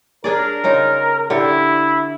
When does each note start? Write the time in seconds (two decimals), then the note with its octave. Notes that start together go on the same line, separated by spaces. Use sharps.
0.24 D4 G#4 A#4 D5
0.64 C#3 D#4 F4
1.30 D3 E4 G4